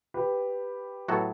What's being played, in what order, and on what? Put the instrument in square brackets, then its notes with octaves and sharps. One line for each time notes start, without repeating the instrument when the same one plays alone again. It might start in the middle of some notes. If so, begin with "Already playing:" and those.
[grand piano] G4 B4
[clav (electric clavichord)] A2 F#3 B3 F#4 A4